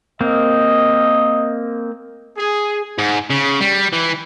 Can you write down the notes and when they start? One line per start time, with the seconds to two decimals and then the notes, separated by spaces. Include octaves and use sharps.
0.21 A#3 C4 D#5
2.38 G#4
2.98 G#2
3.30 C#3
3.61 G3
3.93 E3